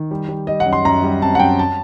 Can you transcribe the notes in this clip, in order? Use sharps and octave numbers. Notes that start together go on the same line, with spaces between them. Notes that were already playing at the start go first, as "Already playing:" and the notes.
Already playing: D#3
G3
G3
G3 D#5
F#5
F#2
C6
F#2 A#5
G3
C4 A5
F#5
F#2 G5
A5